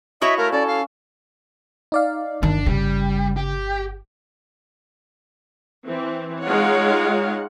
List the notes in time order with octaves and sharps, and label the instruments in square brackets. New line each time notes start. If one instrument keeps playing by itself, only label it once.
[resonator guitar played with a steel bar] E4 F#4 C#5 [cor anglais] D#5 [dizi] E5
[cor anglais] A3 [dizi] A#4 [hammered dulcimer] F5
[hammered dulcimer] C#4 [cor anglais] A4 [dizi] D5
[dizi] F5
[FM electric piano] D#4 D5 F5
[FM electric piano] G1 [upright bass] D#3 [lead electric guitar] D4
[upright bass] C#3 [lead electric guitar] G3
[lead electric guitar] G4
[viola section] E3 C4
G#3 D#4 F4 C#5 F5 F#5